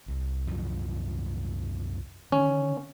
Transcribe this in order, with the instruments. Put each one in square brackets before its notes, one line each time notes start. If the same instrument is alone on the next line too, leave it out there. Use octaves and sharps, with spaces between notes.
[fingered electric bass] C2
C2 F#2 F3
[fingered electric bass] D3 D#3 [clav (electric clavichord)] C#4